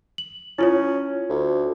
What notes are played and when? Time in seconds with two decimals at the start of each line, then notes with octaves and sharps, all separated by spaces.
0.18 F#7
0.58 C#4 E4 F4 C#5
1.30 D2